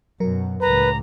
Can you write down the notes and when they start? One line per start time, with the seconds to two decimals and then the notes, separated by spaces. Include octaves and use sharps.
0.20 F#2 B2 F#3 A#4
0.61 C#2 A2 B4 A#5